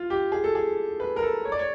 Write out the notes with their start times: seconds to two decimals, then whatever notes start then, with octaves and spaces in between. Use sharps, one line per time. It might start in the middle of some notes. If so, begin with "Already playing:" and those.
Already playing: F4
0.10 G4
0.32 G#4
0.44 A4
0.55 G#4
1.00 B4
1.16 A#4
1.22 A4
1.45 C#5
1.52 D5
1.59 C#5